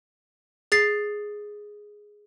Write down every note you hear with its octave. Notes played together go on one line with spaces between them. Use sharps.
G#4 A6 C7